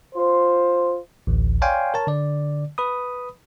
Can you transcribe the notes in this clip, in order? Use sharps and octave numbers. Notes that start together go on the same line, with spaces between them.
F4 C5
A1 D2
C#5 D5 F5 G5 G#5 C6
A#4 C#5 A5
D3 D5
B4 B5 D#6